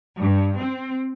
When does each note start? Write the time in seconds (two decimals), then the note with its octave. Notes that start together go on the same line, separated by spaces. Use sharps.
0.20 G2
0.60 C4